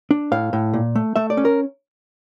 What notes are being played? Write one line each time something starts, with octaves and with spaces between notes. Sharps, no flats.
D4
A2 F5
A2
A#2
A3
A3 E5
D5
C#4
A#4